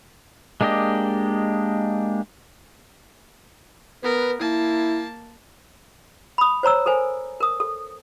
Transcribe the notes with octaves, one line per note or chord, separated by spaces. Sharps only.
G#3 A#3 D4 G4 D#5
B3 A#4 B4
A#3 E4 A5
B5 D#6
C5 C#5 A#5 E6
A4 A#4 C5 G#5
A#4 D#6
A4